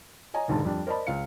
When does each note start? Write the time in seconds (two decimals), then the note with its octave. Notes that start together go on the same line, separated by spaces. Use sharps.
0.34 C#5 D#5 G#5 A#5
0.48 E1 D#2 G#2 D3 A5
0.65 F2 G3 D4
0.87 A#4 C5 D5 D#5 A5 B5
1.07 C#2 C#3 F5 C#7